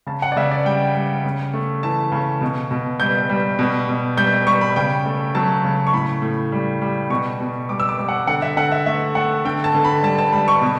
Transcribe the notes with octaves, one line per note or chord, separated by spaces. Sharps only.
C#3 A5
F#5
D5
C#3 E5
D5
G3 G5
G3
C#3
A3
E3 A5
C#3
B2
B2
G3 G6
G3
B2
B2
G3 G6
G3 C#6
B5
C#3 G5
A3
F#3 A5
C#3
C#6
A2 B5
A2
G3
G3
B2 C#6
B2
G3 D6
E6
D6
G3
F#5
D3 F#5
E5
D3 F#5
E5
A3 E5
A3 F#5
D3 G5
A5
D3
B5
G3 A5
A5
G3 B5
C#6
B2